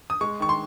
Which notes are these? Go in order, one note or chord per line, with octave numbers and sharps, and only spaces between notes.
D#6
G#3 C#6
D#3 C#6
C6